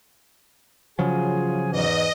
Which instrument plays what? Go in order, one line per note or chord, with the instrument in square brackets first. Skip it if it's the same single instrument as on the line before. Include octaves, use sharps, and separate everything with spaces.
[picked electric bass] C#3 F3 F#3 [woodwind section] F4 G#4 G#5
[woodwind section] E2 G#2 E3 [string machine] D#5